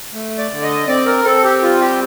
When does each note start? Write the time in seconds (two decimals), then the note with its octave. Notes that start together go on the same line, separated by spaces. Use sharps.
0.14 A3
0.38 D5
0.51 D3
0.62 D#5
0.87 C4 D5
1.06 A#4
1.24 C4 A4
1.43 G4
1.62 G3 F4
1.81 G4